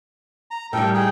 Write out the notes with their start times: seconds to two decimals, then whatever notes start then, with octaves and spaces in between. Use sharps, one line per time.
0.51 A#5
0.73 A2 G3 A4 A#4 G5
0.94 D#4 G#4 G5